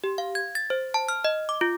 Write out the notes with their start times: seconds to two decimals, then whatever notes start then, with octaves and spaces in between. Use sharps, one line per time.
0.04 G4
0.18 F5
0.35 G#6
0.55 A6
0.70 C5
0.94 A5
1.09 F6
1.25 D#5
1.49 D6
1.61 F4